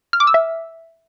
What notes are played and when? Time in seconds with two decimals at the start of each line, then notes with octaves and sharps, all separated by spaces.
0.13 F6
0.20 D6
0.27 E6
0.34 E5